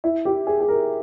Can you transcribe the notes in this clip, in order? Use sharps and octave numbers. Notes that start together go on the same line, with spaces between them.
E4
G4
G#4
G#4
A#4